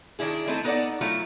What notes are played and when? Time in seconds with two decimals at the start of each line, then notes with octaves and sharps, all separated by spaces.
0.19 D#3 D4 E4 G#4
0.47 A3 C4 D#4 E4 A4
0.64 B3 D#4 A4 C#5 D5 F#5
1.01 F#3 A3 E4 F4